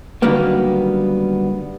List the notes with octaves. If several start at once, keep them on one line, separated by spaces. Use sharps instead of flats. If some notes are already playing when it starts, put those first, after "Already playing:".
D3 D#3 F#3 G3 A#3 B3